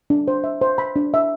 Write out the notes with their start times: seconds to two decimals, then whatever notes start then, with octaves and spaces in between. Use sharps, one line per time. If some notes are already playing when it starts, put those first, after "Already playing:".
0.10 D4
0.28 C5
0.44 E5
0.61 C5
0.78 B5
0.96 D4
1.14 E5